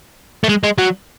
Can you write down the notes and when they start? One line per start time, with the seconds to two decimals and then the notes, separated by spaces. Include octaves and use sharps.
0.44 A3
0.49 G#3
0.63 G#3
0.78 F#3